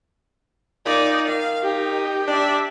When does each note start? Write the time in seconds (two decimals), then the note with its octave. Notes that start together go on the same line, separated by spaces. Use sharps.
0.85 A#2 D#4 D5
1.28 D#3 F5
1.63 D#4 G4
2.28 D4 D5 E5